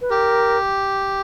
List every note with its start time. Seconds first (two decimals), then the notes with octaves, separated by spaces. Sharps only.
0.01 B4
0.10 G4 A#4